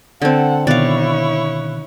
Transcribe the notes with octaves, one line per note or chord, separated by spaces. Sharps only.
D3 C4 A4 F#5
B2 D#3 E4 C#5 D5 F5 F#6